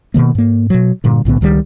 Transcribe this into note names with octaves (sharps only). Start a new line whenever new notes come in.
B2 D3 D#3 A#3
G#2 A#3
B2 F#3
G2 A#2 D3
B1 A2 D3 B3
C#2 D#3 E3 G3